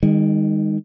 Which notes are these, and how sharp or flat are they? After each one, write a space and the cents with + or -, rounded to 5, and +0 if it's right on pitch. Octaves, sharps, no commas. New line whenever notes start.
D#3 +0 G#3 -40